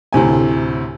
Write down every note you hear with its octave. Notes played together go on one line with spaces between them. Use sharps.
D2 A2 C3 G#5